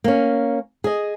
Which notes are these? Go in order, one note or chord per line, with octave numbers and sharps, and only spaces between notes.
A#3 C#4
G#4 D#5